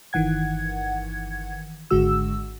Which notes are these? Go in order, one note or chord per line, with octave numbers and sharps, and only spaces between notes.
G1 D#3 E3 F#5 G#6
G#1 D3 G#3 F#4 E6